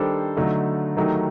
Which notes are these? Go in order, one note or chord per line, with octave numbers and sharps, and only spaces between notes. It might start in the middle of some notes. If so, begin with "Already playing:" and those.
Already playing: D#3 G3 D4 A4 C5
D3 F#3 A3 D#4
D#3 F#3 A3 D#4 G4